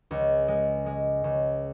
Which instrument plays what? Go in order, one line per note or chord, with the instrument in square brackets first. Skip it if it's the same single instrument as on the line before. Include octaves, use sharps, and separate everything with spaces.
[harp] C#2
G#3
G#3
C#2